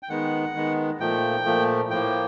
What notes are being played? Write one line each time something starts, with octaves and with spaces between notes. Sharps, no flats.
G5
D#3 G#3 B3 F#5
D#3 G#3 B3
A#2 F3 A3 G5
A#2 F3 A3
A2 F3 A#3 G5